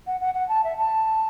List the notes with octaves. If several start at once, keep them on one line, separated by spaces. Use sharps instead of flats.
F#5
F#5
F#5
A5
E5
A5